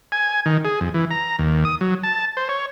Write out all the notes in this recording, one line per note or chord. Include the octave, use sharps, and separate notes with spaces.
G#5
D#3
G#4
F2
E3
A#5
D#2
D#6
F#3
A5
C5
C#5